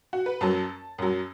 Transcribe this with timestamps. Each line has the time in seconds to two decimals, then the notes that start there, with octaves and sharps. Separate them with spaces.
0.13 F#4
0.26 B4
0.41 F#2 F#3 A5
0.98 F#2 F#3